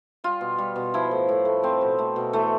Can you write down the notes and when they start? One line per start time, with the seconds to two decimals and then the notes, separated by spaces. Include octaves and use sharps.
0.24 G3 F4
0.41 B2
0.58 G3
0.76 B2
0.94 F3 E4
1.11 A2
1.29 A2
1.45 A3
1.63 A3 C4
1.81 B2
1.99 A3
2.16 B2
2.33 E3 A3